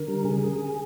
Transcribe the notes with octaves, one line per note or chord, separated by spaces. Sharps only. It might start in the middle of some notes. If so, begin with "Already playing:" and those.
Already playing: D3 A#4
G3
C#3 G#4